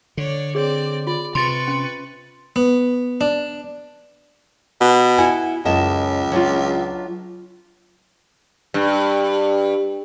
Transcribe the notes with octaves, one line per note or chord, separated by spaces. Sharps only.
D3 C#5 D5
C4 G#4 C#5 D5
F4 D5
C3 B4 C6 C#6 A6
C#4
B3
D4
B2
E4 F#5 G#5
C#2 F#2 D#5 A5
F#3 D4 F4
G2